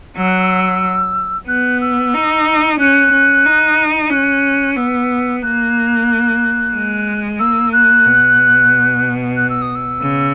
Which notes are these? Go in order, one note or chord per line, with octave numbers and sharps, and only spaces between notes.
F#3 E6
F#6
E6
B3 F#6
E6
D#4
C#4 F#6
C#4
D#4
C#4 F#6
B3 E6
A#3 F#6
G#3
A#3 E6
F#6
B2
F#6
E6
D#6
E6
C#3